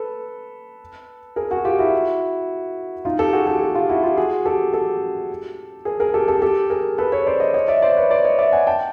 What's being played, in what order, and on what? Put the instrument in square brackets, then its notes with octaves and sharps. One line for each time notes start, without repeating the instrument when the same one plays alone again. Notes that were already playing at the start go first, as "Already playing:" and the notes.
Already playing: [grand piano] A4 B4
G#4 A#4
F#4 G#4
F4 G4
E4 F#4
D#4 F4
G4 A4
F#4 G#4
G4 A4
F#4 G#4
F4 G4
E4 F#4
F4 G4
F#4 G#4
G4 A4
G4 A4
G#4 A#4
G#4 A#4
G4 A4
G4 A4
G4 A4
G#4 A#4
A4 B4
B4 C#5
C5 D5
C#5 D#5
C#5 D#5
D5 E5
C5 D5
B4 C#5
C5 D5
C#5 D#5
D5 E5
F#5 G#5
G5 A5